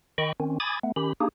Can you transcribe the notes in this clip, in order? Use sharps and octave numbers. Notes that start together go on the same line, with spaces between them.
D#3 D#5 G5 B5 C#6
D#3 C4 C#4
G#5 B5 D6 D#6 G#6 A6
A3 B3
D#3 C#4 G4 B5
A#3 D4 D#4 G4 G#4